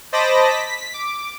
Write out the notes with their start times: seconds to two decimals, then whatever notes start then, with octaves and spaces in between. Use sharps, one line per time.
0.12 C5 D#5 A5 B5 D6 A#6
0.49 B6
0.94 D6